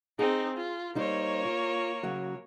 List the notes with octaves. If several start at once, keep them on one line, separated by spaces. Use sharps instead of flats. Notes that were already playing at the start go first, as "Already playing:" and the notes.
C4 D#4 G#4
F4
G3 A#3 D#4 C5 C#5
F4
C#3 F#3 F#4